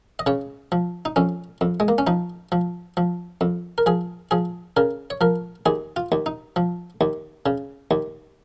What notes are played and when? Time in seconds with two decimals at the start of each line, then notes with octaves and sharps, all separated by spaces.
0.19 D#5
0.26 C#3 C#5
0.72 F3
1.05 D#4
1.16 F2 C#4
1.61 F2
1.80 G#3
1.88 A#3
1.98 C#4
2.07 F3 D#4
2.52 F3
2.97 F3
3.41 F2
3.78 A#4
3.86 F3 G#4
4.31 F3 G#4
4.77 C#3 A#4
5.10 C#5
5.21 F3 A#4
5.66 D#2 G#4
5.96 F4
6.12 D#2
6.26 D#4
6.56 F3
7.01 D#2
7.46 C#3
7.91 D#2